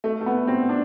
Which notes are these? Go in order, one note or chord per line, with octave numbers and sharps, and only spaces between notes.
A3
A3
B3
C4
D4